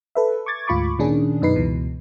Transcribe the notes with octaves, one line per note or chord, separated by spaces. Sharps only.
A4 B4 E5
C#6 D6 G#6 A6
D2 G#2 F4 B5 C#6 D6
A#2 D#3 C#4 D4 G#4
F#2 B2 D#4 B4 C7
C#2 B2 E3